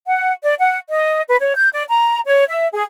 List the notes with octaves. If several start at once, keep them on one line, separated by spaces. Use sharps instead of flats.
F#5
D5
F#5
D#5
B4
C#5
G6
D5
A#5
C#5
E5
G#4